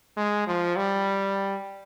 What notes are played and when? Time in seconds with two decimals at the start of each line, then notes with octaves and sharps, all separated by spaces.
0.17 G#3
0.47 F3
0.76 G3